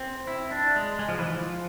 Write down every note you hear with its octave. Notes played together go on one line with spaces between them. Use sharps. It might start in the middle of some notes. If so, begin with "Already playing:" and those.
Already playing: C4
E4
D4
G#3
G#3
F3
E3
F3